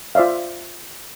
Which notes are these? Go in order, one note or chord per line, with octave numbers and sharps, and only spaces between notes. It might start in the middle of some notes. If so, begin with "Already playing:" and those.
F4 C5 D5 E5 F5